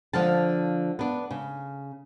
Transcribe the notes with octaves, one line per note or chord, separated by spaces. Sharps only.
D3 F3 F5 A5
B3 D4
C#3